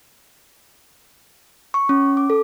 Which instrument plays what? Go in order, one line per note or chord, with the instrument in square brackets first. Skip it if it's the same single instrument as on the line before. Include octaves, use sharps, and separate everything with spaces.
[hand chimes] C#6
C#4
D6
A4